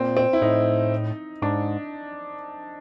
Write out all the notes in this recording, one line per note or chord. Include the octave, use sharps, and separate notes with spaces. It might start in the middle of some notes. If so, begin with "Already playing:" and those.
Already playing: A#2 C4
C4
E4
A2 D#4
G#2 D4